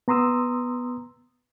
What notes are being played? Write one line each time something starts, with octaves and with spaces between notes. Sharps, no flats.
B3 A#5 C6 D#6 E6